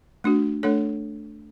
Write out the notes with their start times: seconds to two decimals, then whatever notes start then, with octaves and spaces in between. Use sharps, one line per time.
0.24 A3 D4 F#4
0.63 A3 D4 A4 C#5